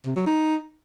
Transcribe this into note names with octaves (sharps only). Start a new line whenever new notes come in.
C3
F#3
D#4